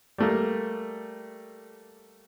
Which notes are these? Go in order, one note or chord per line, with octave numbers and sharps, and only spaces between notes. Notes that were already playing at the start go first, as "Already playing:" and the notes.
G3 A3 A#3